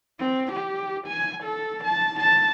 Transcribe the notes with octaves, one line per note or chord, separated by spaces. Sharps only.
C4
G4
G#5
A4
A5
A5